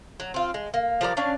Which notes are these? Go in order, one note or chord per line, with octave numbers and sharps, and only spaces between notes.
F#3
C4 F4
G#3
A#3
F3 G3 A#4 D5
C#4 D4 F5